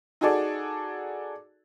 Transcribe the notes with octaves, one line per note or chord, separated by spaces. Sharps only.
D#4 F#4 G#4 A4 D5